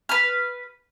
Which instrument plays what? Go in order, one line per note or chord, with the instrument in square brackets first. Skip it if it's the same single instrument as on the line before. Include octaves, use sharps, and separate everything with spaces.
[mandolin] B4 F6